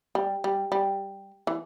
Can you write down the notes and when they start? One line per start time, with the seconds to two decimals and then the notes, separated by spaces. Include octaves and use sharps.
0.15 G3
0.44 G3
0.72 G3
1.47 E3